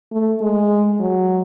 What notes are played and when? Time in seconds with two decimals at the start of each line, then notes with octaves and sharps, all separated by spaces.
0.12 A3
0.41 G#3
1.00 F#3